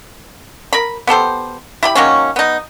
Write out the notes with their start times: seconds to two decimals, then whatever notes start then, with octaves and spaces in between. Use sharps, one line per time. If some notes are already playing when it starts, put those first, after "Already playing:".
0.73 A#4 B5
1.07 B3 G4 A4 C5
1.83 E4 G4 B5
1.95 D#3 F#3 A#3 C#4
2.36 B3 D#4